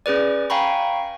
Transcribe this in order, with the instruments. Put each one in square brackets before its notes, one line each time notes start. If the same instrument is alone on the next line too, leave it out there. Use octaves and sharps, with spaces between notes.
[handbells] C#4 G#4 B4 D5
F5 G5 G#5 A#5 B5 C#6